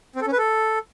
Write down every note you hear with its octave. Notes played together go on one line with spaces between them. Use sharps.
C4
A4
C#4
B4
A4